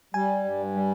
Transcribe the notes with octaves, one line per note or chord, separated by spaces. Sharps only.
G3 G#5
G2
G3